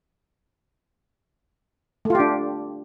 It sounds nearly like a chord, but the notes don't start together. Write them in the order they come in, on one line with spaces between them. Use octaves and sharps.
A3 F4 G4 D4